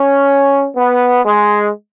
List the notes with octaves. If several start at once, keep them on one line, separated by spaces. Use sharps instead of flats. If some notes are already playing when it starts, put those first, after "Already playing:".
Already playing: C#4
B3
G#3